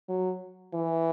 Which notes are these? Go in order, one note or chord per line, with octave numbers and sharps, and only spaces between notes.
F#3
E3